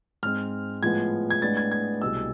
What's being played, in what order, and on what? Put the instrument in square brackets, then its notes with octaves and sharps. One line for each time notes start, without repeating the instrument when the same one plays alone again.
[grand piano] G#2 G#3 C4 F6
A2 F3 G#3 B3 G#6
G#6
A2 G#3 B3 D4 A6
G#6
G#6
C2 B2 G#3 E6